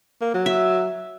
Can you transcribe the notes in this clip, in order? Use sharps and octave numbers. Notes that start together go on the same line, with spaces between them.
A#3
F#3
E5